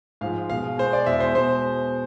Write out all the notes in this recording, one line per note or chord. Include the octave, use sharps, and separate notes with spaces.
G#2 F3 G#3 F5
B2 G#3 F5
B2 G#3 C5
D5
E2 B2 G#3 E5
C5
B2 G#3 C5